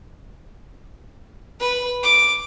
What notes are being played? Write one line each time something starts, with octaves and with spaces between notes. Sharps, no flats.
B4
D6